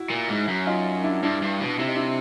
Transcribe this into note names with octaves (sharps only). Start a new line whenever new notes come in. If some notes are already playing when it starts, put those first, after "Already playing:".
Already playing: E4 F#4
A#2
G#2
F#2
D#4 F4
D4 E4
G2 D4 E4
G2
B2
C3 E4
D#4
D4 E4